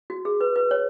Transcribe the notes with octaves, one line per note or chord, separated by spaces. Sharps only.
F#4
G#4
B4
B4
C#5